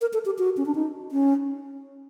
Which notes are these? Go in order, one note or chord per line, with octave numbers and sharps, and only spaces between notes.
A#4
A4
G4
F#4
C#4
D4
D#4
C#4